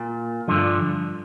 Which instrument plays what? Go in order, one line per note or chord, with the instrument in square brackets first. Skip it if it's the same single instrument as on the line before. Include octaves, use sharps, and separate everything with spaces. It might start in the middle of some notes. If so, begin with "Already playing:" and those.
Already playing: [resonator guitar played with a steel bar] A#2
[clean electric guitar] G2 D3 F3